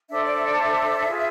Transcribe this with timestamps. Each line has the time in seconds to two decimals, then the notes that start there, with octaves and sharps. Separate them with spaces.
0.10 D4 A4 C5 E5
0.23 D5
0.35 E5
0.46 D5
0.59 E5
1.06 F4 G#4 B4